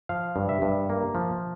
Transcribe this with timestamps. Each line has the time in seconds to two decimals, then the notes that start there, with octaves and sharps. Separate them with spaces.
0.09 F3 F5
0.36 G2
0.49 E5
0.62 G2
0.89 A#3
1.15 F3